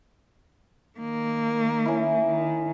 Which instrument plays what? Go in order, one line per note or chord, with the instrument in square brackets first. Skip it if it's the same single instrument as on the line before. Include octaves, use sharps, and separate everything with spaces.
[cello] D#3 A#3
[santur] C#4 E4
[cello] D#3